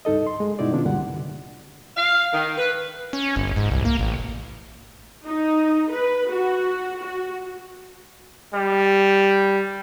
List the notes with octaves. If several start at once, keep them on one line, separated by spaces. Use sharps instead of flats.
C2 G2 D#4 A4 D#5
C6
G#3
G2 B2 D#4 E4 F#4 D5
C3 D#3 B3 C#4 D4 F4
C#2 F#2 A#2 D3 G3 F#5
F5
D#3
B4
C#4
G1
G#2
C2
A#3
A1
D#4
B4
F#4
F#4
G3